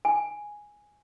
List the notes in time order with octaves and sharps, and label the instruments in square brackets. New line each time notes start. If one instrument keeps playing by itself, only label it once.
[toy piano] G#5